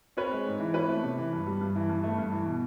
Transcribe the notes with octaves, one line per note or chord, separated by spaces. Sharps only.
C4 B4 C#5
G#3
G#2
E3
C4 B4 C#5
A3
C3
E3
G2
G3
G2
E3
G2
A3
G2
E3
B2